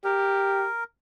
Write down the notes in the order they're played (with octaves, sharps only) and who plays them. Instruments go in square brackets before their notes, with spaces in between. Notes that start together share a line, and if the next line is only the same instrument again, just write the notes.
[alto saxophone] G4 [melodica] A#4